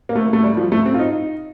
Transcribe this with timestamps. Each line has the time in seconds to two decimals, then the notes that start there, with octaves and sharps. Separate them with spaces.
0.09 A#3
0.15 A3
0.33 A3
0.44 G3
0.57 F3
0.72 A3
0.85 C4
0.94 F4
0.99 D#4